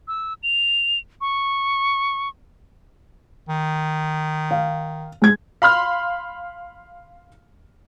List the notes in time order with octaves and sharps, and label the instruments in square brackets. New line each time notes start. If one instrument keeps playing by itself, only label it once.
[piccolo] E6
F7
C#6
[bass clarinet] D#3
[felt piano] F5
G#3 G#6
[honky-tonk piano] F5 B5 C6 F6